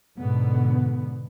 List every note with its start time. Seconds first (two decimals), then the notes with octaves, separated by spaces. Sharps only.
0.17 G#2 B2 D3 B3